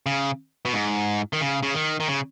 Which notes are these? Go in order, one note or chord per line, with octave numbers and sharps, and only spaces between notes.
C#3
B2
G#2
D#3
C#3
C#3
D#3
D#3
C#3